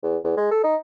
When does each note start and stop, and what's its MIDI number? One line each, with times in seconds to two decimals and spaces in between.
0.03 0.17 40
0.24 0.35 40
0.37 0.48 56
0.51 0.61 69
0.63 0.76 63